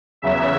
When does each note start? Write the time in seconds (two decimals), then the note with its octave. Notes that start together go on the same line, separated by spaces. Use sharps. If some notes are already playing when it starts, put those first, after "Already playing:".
0.22 E2 C#3 F#3 E5